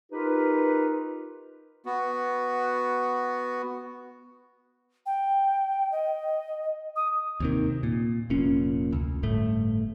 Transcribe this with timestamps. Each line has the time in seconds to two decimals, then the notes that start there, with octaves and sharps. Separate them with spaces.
0.11 D#4 F4 G4 A#4 B4
1.86 B3 F#4
5.06 G5
5.92 D#5
6.96 D#6
7.40 D#2 C3 D#3
7.83 A#2
8.30 F1 A#2 C#4
8.93 D2
9.23 G1 A2 A3